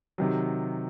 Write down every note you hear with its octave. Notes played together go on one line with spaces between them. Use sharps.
C3 D#3 F#3